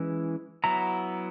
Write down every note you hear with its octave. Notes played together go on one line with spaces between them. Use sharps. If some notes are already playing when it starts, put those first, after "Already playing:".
Already playing: E3 G#3 C#4 E4
F#3 B3 E4 A#5